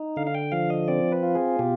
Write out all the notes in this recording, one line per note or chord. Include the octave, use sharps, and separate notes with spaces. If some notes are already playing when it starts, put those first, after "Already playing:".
Already playing: D#4
D3 F5
F5
G5
F3 F5
D#5
C4 D5
B4
F4
G#4
B2 G4